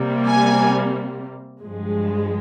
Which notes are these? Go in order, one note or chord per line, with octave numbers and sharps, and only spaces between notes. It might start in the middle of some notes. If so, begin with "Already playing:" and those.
Already playing: C3 G3 A#3
G#5
G2 F3 G#3